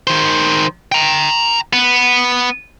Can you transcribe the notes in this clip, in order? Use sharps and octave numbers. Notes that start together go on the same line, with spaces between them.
D#3 C5
G5 A#5
B3